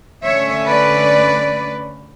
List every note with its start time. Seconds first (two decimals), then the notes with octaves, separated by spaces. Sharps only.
0.24 D3 A3 C#4 C#5 E5
0.68 B4 D5